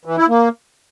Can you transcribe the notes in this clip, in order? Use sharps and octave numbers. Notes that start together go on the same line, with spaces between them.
E3
E4
A#3